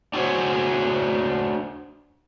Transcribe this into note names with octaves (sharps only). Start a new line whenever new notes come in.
D4 F#4 G#4 C5 C#5